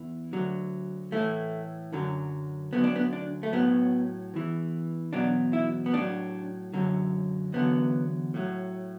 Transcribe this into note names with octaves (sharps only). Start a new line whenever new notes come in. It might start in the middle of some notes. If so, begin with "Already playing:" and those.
Already playing: E2 E3
D2 D3 F#3
A2 E3 A3
F#2 D3 F#3
D2 D3 F#3 B3
D4
B3
D4
A3
A2 F#3 B3
E2 E3
E2 B2 F#3 D4
E4
B3
A2 F#3 D4
F#2 D3 F#3
E2 D3 F#3 B3
A2 F#3